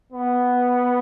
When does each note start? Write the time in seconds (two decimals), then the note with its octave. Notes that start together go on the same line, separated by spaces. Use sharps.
0.12 B3